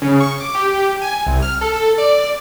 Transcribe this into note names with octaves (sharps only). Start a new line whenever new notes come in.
C#3
C#6
D6
G4
G#5
C2
F6
A4
D5